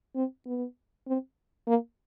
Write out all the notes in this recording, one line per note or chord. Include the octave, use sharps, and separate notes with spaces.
C4
B3
C4
A#3